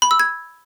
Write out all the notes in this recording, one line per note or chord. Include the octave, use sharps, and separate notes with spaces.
B5
E6
G#6